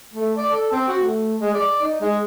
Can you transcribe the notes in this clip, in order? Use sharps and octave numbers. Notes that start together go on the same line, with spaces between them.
A3
D5
A4
C4
F#4
A3
G#3
D5
D#4
G#3